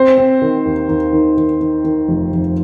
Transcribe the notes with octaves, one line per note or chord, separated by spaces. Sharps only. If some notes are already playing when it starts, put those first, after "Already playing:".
Already playing: C4 C5
C4
D#3
D#2
D#2
D#3
D#3
D#3
D#3
F1
F1